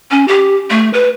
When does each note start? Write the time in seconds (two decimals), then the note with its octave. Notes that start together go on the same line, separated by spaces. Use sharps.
0.11 C#4
0.28 G4
0.71 A3
0.93 B4